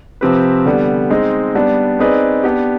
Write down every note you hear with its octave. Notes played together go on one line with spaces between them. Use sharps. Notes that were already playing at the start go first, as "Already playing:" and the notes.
C3 F3 C4 G4 B4
D3 G3 B3
G#3 C4 D#4
G3 B3 D4
C4 D#4 G#4 B4 D5
B3 D4 G4